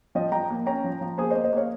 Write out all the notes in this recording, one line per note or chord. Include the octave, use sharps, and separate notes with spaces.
F3 D#5 G5
F3 G5 A#5
A#3
C#4 G5 A#5
F3
F3
A#3 G#4 C5
C5 D#5
A#3
C5 D#5
A#3 C#5 F5